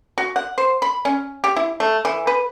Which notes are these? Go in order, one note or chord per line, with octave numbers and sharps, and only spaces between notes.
F#4
F#5
C5
B5
C#4
G4
E4
A3
E3
B4